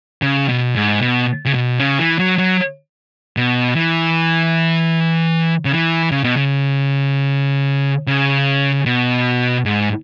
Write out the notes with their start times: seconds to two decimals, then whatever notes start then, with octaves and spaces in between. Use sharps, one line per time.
0.22 C#3
0.49 B2
0.76 G#2
1.01 B2
1.45 C#3
1.54 B2
1.79 C#3
1.99 E3
2.19 F#3
2.38 F#3
3.37 B2
3.76 E3
5.65 C#3
5.72 E3
6.12 C#3
6.24 B2
6.37 C#3
8.07 C#3
8.86 B2
9.65 G#2